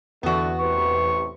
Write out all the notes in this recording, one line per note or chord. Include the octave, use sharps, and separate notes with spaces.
E2 D3 E3 A3 B3 F#4
A1 C3 B4 C#6